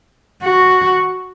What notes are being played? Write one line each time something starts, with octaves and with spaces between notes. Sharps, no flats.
F#4